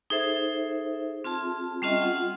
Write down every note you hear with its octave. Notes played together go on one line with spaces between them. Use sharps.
D#4 G#4 A4 C5 E5
C4 F4 G#4 A5
G3 C4 C#4 F4 D#5 E5
F4 F#5